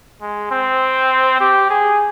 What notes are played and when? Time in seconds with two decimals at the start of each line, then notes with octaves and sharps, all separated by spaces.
0.22 G#3
0.51 C4
1.41 G4
1.70 G#4